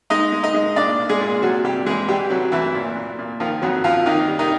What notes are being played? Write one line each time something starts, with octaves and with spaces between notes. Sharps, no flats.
G#3 D#4 D#5
G#3
D#4 D#5
G#3
A#2 D4 D5
A#2
G#3 G#4
A#2
C3 F#3 F#4
C3 G3 G4
E3 G#3 G#4
E3 G3 G4
C3 F#3 F#4
D2 E3 E4
A#2
A#2
A#2
D#3 F3 F4
F2 F#3 F#4
F2 F3 F4
D#3 A#3 D#4
G3
D#3 D#4